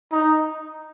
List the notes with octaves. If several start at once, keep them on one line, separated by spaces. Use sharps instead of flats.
D#4